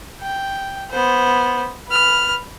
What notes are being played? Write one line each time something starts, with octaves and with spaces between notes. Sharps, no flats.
G5
B3 C5
B4 F6